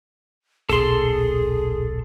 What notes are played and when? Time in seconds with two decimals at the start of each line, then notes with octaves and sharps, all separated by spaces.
0.69 D#1 B1 G#4 A4 C6